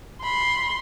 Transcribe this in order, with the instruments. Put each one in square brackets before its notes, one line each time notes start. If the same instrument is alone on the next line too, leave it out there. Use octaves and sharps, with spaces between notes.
[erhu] B5 [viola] C6